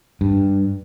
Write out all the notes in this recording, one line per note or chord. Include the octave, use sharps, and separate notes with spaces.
G2